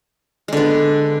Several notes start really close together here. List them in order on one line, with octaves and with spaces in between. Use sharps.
G#3 D3 B3